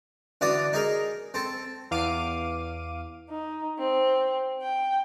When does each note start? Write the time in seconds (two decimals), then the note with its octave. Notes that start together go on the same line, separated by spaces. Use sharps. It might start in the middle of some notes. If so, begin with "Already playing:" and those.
0.41 D3 E3 F#4 D5 D#6
0.73 D#4 G#4 A#4
1.34 C4 A4
1.91 E2 F5 D6 D#7
3.29 D#4
3.78 C4
4.61 G5